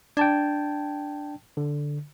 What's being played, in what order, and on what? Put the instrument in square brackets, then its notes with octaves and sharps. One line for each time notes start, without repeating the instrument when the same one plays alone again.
[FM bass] D4 [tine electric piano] G5 A5 G#6
[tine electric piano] D3